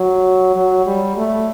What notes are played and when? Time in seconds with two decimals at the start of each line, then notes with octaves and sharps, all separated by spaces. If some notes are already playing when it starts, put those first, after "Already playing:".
Already playing: F#3
0.56 F#3
0.86 G3
1.17 A3